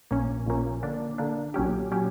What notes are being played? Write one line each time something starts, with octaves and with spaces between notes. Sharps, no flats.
A#1 A#2 A#3 C#4
A#1 A#2 A#3 C#4
D3 A#3 D4
D3 A#3 D4
B1 A#2 F#3 C#4 G4
A#2 F#3 C#4 G4